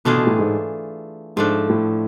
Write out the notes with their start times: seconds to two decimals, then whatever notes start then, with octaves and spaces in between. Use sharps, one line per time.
0.05 B2 E3 A3 D4 F4 G#4
0.16 B2
0.27 A2
0.39 G#2
1.36 G#2 F3 A3 D4
1.69 A2